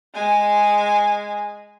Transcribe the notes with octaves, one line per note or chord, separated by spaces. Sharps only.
G#3 G#5